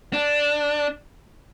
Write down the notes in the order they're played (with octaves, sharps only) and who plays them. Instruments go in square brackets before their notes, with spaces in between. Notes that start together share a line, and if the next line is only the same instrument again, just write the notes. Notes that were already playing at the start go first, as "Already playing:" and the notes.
[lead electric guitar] D4